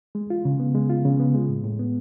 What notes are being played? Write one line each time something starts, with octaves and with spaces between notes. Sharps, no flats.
G#3
F4
C#3
B3
G#3
F4
C#3
B3
G#3
A2
A2
B3